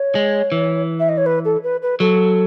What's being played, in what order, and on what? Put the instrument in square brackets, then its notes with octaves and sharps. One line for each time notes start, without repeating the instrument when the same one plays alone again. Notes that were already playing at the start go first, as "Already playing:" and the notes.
Already playing: [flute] C#5
[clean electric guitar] G#3
E3
[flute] E5
D#5
C#5
B4
A4
B4
B4
[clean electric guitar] F#3 [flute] A4